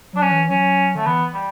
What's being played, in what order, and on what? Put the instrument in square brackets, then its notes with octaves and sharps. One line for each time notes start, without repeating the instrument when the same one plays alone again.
[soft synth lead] F#3 [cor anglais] D4
[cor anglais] C#4
[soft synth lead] E3
[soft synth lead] F#3 [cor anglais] C#4
[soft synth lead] D3 [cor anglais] A3
[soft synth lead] E3 [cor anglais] B3
[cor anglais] G3